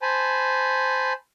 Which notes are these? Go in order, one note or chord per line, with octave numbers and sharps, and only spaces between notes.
C5 G#5 A5 B5